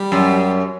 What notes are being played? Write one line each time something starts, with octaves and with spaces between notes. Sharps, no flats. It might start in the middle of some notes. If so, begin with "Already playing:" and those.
Already playing: G3
F#2